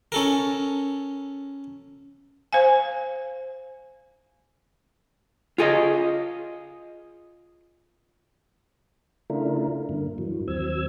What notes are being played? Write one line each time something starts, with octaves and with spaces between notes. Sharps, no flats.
C#4 A4 A#4
C5 F5 G#5
F4 G#4 D#5
C#3 A3 D4 E4 F4 A#4
G2 D3 A#3
G2 E3 F#3
D#2 F#3 C4 E6 G#6